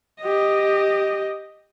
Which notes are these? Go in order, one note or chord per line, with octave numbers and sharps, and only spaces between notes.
G4 D#5